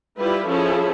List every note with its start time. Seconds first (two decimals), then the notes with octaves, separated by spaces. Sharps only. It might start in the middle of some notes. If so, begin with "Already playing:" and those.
0.19 G3 E4 F4 G4 B4
0.48 F3 C#4 E4 G#4 A4 C#5